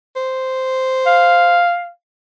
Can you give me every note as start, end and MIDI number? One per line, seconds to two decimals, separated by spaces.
0.16 1.64 72
1.06 1.88 77